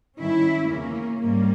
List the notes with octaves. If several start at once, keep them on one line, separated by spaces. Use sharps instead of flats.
G2 D#3 C#4 E4
E2 C#3 E3 A#3 C#4
G#2 G3 A#3